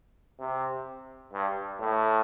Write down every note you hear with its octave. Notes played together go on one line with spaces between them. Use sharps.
C3
G2
A2